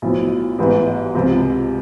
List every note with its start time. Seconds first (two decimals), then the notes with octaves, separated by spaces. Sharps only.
0.02 B1 A2 F3
0.59 A1 G#2 E3 G3 B3
1.15 C#2 C3 F3